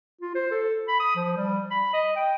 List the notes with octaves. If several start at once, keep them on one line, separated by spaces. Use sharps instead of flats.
F4
C5
A4
B5
D#6
F3
G3
B5
D#5
G5